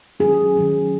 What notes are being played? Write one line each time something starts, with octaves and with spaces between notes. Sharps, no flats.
D#3 F#3 C#4 G#4
D#3 F#3 C#4